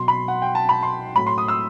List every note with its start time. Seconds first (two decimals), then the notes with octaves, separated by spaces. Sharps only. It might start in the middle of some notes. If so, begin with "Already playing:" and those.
Already playing: B2 F#3 C6
0.08 B5
0.28 F#5
0.42 G5
0.55 A5
0.69 B5
0.83 C6
1.15 A2 F#3 B5
1.27 C6
1.38 D#6
1.48 E6